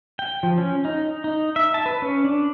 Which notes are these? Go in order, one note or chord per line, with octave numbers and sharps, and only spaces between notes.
G5
F3
C#4
D#4
D#4
E5
A5
B4
C#4
D4